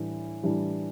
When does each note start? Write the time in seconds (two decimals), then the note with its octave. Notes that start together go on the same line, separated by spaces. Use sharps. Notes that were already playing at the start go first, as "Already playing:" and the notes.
Already playing: A2 E3 G3 D4
0.43 A2 E3 G3 D4